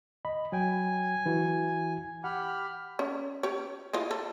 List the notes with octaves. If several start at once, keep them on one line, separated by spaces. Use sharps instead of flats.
D#5 B5
F#3 G5 G#5
E3 E4 F#4
G4 F#5 B5 F6
C#4
G4 C#5
E3 F4 D#5
A4